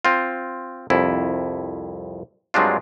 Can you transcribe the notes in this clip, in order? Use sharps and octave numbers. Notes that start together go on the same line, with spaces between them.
C4 F4
C2 F2 E4
G2 F#3 G#3 C4 D4 F4